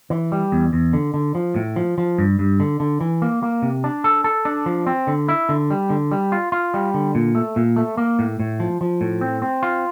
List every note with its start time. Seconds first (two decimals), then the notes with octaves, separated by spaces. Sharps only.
0.10 E3
0.32 G3
0.52 E2
0.73 E2
0.93 D3
1.14 D3
1.35 F3
1.56 A2
1.76 F3
1.98 F3
2.18 G2
2.39 G2
2.60 D3
2.80 D3
3.01 E3
3.22 A#3
3.43 A#3
3.62 C3
3.84 D4
4.04 A4
4.24 A4
4.45 D4
4.66 F3
4.87 C4
5.07 D3
5.29 E4
5.49 D3
5.70 G3
5.90 D3
6.11 G3
6.32 F4
6.52 F4
6.74 G3
6.94 D3
7.15 A#2
7.35 A3
7.56 A#2
7.76 A3
7.97 A#3
8.19 A2
8.40 A2
8.60 F3
8.81 F3
9.01 A2
9.21 C4
9.42 C4
9.63 F4